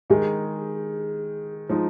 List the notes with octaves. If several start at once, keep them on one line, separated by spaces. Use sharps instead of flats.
D#3 G#3 D#4 G#4
F3 G#3 D#4